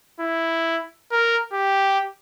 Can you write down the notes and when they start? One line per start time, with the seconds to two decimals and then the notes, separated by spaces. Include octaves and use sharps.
0.20 E4
1.11 A#4
1.53 G4